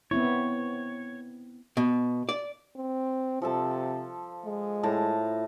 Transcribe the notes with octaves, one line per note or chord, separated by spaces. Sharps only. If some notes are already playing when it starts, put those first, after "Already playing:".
B3 C4 E4 C#5
B2
D5
C4
C3 F3 A4 A5
G#3
A2 A5 A#5